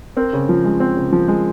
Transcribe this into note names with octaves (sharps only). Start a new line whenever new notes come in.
C4 A#4
C#3
F3
G#3
C4
C#3
F3
G#3